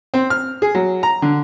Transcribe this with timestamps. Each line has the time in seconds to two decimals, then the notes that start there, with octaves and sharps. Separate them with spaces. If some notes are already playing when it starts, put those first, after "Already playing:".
0.14 C4
0.30 F6
0.62 G#4
0.75 F#3
1.03 A#5
1.22 D3